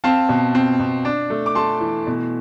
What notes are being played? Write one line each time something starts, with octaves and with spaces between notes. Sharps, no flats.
C4 F5 A5
B2
C4
B2
D4
A3
D6
A3 A5 C6
E3
B2